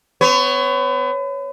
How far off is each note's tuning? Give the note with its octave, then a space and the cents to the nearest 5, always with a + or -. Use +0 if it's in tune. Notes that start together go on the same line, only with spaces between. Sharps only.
B3 +35 C#5 +0